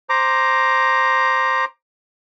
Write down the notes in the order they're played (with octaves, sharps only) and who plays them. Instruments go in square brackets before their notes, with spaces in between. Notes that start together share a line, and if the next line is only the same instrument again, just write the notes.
[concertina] C5 A#5 D6